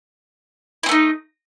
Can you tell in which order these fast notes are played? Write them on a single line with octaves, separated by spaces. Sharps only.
E4 C4 A3 D#4